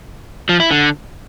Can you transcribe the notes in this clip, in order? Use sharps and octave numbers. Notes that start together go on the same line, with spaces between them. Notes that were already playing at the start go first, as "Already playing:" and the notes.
F3
E4
D3